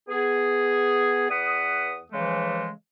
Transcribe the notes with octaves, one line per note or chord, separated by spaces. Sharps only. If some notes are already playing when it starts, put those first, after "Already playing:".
B3 G#4
E2 B4 F#5 D#6
C#3 E3 F3 G#3 A3